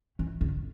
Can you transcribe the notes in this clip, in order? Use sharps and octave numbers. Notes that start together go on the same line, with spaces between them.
E3
D3